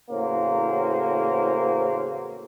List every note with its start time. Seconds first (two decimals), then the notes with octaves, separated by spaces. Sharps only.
0.11 E2 A2 C#3 F#3 A#3 C5